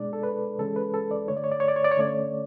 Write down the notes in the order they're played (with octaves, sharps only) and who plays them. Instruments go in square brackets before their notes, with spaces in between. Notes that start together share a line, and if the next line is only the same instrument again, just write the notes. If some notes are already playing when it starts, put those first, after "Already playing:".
Already playing: [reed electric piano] B2 G#3 D4 D5
A4
B4
C#3 E3 G#3 C#4 A4
B4
A4
D5
D3 A3 D4 C#5
D5
C#5
D5
C#5
D5
C#5
D5
C#5
D3 A3 C#4 D5
C#5